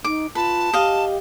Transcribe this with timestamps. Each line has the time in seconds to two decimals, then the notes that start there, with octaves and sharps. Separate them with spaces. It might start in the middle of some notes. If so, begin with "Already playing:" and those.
0.04 D#4 D6
0.35 F4 B4 A5
0.73 G4 D#5 F5